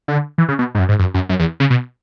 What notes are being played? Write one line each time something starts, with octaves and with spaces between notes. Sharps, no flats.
D3
E3
C#3
B2
G#2
F#2
G#2
F#2
F#2
F#2
E2
C#3
B2